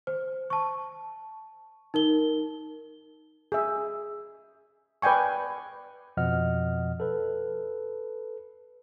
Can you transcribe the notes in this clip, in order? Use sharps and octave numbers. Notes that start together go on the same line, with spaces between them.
C5
A5 C#6
D#4 A#4 G7
G#4 E5
B4 D5 G5 G#5 C#6
F2 B2 F3 D#5 F#5 F6
A4 B4